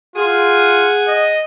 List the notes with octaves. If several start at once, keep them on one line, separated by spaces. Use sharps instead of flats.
F4 G#4 F#5
D#5